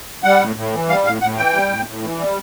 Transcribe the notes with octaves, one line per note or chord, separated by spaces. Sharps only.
G3 F#5
A2
A2
E3
G3 F5
A2 F5
A2 F#5
E3 G5
G3
A2
A2
E3
G3